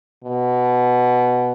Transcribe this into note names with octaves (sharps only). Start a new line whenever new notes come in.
B2